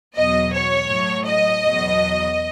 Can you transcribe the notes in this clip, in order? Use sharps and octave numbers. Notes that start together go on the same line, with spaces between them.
E2 B2 F#3 D#5
C#5
A2 F#3
D#5
E2 B2 F#3